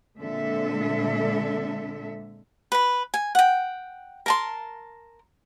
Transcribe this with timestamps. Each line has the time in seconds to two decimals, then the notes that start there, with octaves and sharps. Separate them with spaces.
0.19 A#2 D3 G#3 C4 A4 E5
2.72 B4 B5
3.14 G#5
3.35 F#5 G5
4.26 A#4 A5 C6